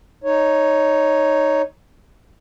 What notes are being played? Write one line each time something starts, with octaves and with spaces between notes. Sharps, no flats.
D#4 C#5